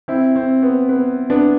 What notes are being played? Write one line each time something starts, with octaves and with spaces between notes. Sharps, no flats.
C4 E4
C4
B3
B3
B3 D4